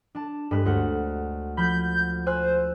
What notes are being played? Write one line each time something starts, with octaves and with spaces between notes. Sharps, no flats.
D4 A5
G2 G#3 B4
D2 C5 F#5
F3 B5 G6 B6
C5 G#5 E6 F#6